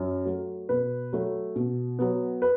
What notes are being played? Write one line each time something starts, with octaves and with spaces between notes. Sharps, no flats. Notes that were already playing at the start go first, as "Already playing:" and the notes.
Already playing: F#2
F#3 A3
B2 B4
F#3 A3
B2
F#3 B3
B4